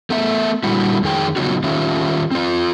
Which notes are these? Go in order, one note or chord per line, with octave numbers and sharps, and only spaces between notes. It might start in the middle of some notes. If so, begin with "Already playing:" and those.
A3 B3 E5
A#2 D3 G3 E4 F#4
F2 D#3 G#4 G5
C#3 F#3 B3 D#4 F4 F#4
D#3 C#4 F4 G4 E5
C4 F4